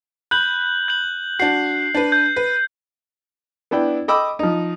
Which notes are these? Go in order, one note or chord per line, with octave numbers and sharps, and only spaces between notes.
B5 F#6 G6 F#7
G6 F#7
D4 F#4 C7
D4 B4
G6
B4
B3 D4 E4 G5
D#5 G5 B5 D6 E6
F3 D#4